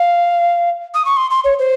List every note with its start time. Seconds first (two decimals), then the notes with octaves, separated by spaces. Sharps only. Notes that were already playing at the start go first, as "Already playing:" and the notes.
Already playing: F5
0.94 D#6
1.05 C#6
1.17 C6
1.31 C6
1.44 C#5
1.59 C5